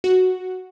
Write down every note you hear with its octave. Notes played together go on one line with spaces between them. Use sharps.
F#4